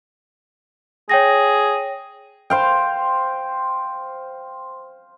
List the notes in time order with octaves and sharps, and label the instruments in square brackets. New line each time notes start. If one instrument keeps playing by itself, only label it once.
[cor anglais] G#4 [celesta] C#5 G5 A#6
[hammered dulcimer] C5 F5 G5